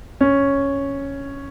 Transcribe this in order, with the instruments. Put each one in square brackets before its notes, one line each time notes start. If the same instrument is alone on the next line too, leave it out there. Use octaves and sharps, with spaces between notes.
[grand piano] C#4